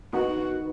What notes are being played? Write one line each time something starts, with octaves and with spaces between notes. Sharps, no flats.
D#3 B3 D#4 F#4